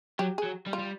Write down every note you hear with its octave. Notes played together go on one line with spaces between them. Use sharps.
F#3 G4
G#4
F#3
G3
F4
G3